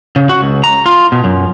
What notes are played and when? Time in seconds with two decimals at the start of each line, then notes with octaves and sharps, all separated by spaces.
0.16 C#3
0.29 F#4
0.42 C#2
0.64 A#5
0.86 F4
1.12 B2
1.24 F#2